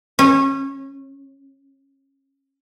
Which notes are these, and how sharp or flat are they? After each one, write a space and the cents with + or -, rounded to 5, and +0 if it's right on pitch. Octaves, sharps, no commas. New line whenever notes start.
C#4 -25